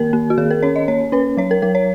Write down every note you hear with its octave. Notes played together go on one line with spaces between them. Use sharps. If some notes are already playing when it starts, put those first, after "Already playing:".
Already playing: D#3 A#3 A#4
A#3
F#4
D#3 G#4
A#4
C#4 C#5
D#5
A#3 C#5
C#4 B4
F#3 C#5
A#4
F#3 A#4
C#5